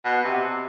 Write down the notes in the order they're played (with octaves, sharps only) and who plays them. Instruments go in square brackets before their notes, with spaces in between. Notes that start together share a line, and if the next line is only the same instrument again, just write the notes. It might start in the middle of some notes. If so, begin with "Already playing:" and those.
[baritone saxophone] B2
C3